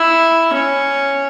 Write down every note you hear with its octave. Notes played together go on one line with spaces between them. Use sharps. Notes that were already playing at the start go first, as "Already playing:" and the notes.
Already playing: E4
C#4